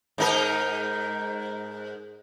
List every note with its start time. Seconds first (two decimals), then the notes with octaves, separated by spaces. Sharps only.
0.18 G#2 D#4 A#4